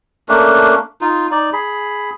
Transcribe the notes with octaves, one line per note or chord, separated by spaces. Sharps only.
A3 A#3 C#4 D4
D#4 F4
D#4 D5
G#4 B5